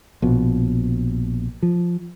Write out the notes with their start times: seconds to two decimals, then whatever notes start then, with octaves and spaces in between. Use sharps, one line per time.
0.22 A#1 B2
1.62 F3